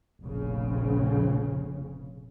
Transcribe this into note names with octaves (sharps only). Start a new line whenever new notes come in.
F1 A#1 C#3